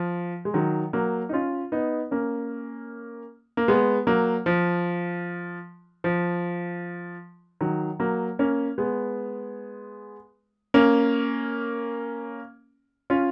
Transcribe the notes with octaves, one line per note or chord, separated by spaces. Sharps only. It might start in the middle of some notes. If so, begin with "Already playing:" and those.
Already playing: F3
G#3
D#3 F#3
F#3 A#3
D#4
C#4 F4
B3 D#4
A#3 C#4
A#3
G#3 B3
F#3 A#3
F3
F3
D#3 F#3
F#3 A#3
A#3 C#4
G#3 B3
A#3 C#4
C#4 F4